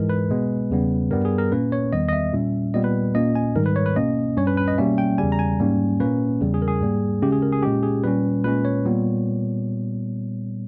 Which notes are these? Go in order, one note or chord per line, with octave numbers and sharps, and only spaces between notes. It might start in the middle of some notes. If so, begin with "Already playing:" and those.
Already playing: G#2 E3 G#3 A#4
B4
B2 G#3 B3
E2 C#3 G3 B3
G2 G3 B3 A#4
G#4
A#4
A#2 A#3 C#4 B4
C#5
E2 D#3 G3 B3 D#5
D#5
E5
A#2 G3 C#4
A#2 G3 B3 D#5
B4
A#2 A#3 C#4 D#5
G#5
G#2 D#3 G3 A#4
B4
C#5
B4
B2 A#3 C#4 D#5
G2 G3 C#4 C#5
B4
B4
D#5
B2 G3 A#3 C#4 E5
G5
E2 C#3 G3 G#5
A#5
G#5
G#2 G3 A#3 C#4
A#2 A#3 C#4 B4
E2 C#3 G3
G#4
A#4
G#4
G#2 G3 A#3
C#3 G#3 C#4 G4
G#4
A#4
G#4
A#2 G#3 C#4 G4
G#4
A#2 G3 C#4 B4
A#2 G#3 C#4 B4
C#5
A#2 G3 B3